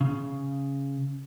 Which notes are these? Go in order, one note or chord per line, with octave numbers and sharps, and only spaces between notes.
C#3